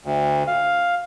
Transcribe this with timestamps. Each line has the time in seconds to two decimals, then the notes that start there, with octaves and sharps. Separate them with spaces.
0.05 D2
0.48 F5